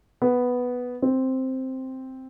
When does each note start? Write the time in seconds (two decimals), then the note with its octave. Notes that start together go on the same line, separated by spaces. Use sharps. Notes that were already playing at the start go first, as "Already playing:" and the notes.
0.22 B3
1.02 C4